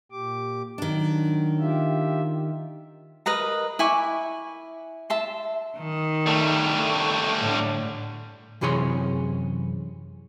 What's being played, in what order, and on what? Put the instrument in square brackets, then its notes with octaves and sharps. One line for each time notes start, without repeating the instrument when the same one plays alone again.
[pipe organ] A#2 G4 D6
[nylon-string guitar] D#3 D4 [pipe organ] F#3
[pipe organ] F4 G4 E5
[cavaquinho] A#4 B4 D#5 A#5
E4 G#5 C#6 D6
E5 A5 C6
[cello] D#3
[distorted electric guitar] G3 A3
[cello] A2 D3
[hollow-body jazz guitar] F#2 C3 E3 G#4 C#5 C6